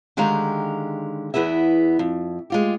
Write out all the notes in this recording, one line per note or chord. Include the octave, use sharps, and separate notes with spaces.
D3 D#3 G#3 G4 F5 A#5
E2 B3 E4 G#4 E5
F2
G#3 F4 G4